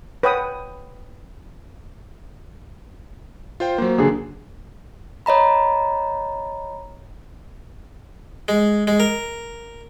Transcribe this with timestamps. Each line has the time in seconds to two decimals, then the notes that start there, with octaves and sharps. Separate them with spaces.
0.23 B4 C#5 F#5 G5 D#6
3.60 F4 C5 G5
3.78 F#3 A#3 C5
3.98 D3 G#4
5.26 C#5 D#5 A#5 B5
8.48 G#3
8.87 G#3
9.00 A#4